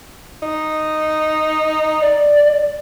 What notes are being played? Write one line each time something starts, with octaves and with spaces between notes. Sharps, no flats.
D#4
D5